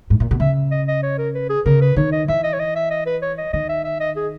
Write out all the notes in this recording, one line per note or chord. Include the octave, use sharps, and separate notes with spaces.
G#2
A#2
B2
C#3 E5
D#5
D#5
C#5
A#4
B4
G#4
C#3 A#4
B4
D#3 C#5
D#5
E3 E5
D#5
C#5
D#5
E5
D#5
B4
C#5
D#5
D#3 D#5
E5
E5
D#5
G#4